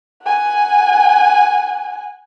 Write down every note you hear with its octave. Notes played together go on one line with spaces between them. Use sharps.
F#5 G#5